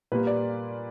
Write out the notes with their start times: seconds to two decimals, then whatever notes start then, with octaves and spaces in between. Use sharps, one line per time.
0.12 A#2 G3 A#3 B4
0.27 D5